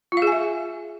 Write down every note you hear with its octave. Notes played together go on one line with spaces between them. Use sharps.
F4
F5
G#4
G#5
E5